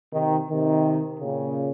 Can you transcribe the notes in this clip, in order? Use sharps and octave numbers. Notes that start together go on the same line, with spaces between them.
C3 D#3
C3 D#3
A#2 C#3